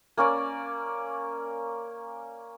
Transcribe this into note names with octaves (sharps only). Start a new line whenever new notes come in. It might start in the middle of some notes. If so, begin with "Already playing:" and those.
A#3 C#4 C#5 D5